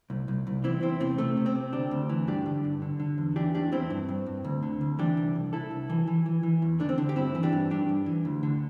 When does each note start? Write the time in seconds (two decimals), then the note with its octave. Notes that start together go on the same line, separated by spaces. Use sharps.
0.10 C2
0.28 C2
0.47 C2
0.64 E3 C4 E4
0.82 E2 C4 E4
1.00 C3 C4
1.18 C3 A3
1.37 C3
1.46 C4
1.55 C3
1.73 D2 D4 G4
1.91 D2
2.10 E3
2.27 G2 D4 G4
2.46 D3
2.64 G2
2.82 D3
3.00 D3
3.18 E2
3.36 E3 D4 G4
3.54 E2 D4 G4
3.72 E2 C4 E4
3.90 G2
4.09 G2
4.26 G2
4.44 D2
4.63 D3
4.81 D2
4.99 E3 D4 G4
5.17 C2
5.35 C2
5.53 C2 E4 A4
5.71 C2
5.90 E3
6.07 E3
6.26 E3
6.43 E3
6.62 E2
6.80 D3 D4
6.89 C4
6.98 D3
7.09 G4
7.16 G2 C4 E4
7.35 E3
7.43 D4 G4
7.52 G2
7.70 G2 D4 G4
7.89 G2
8.06 E3
8.25 D2
8.43 D3